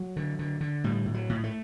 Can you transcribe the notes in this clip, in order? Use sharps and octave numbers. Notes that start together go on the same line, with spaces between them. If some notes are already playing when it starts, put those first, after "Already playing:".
Already playing: F#3
D3
D3
D3
A2 G3
A2
F#3
A2
A3